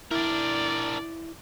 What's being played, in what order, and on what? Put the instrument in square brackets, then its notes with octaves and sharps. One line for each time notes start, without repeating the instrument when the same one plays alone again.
[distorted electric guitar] D4 A#4 [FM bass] E4 [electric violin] D5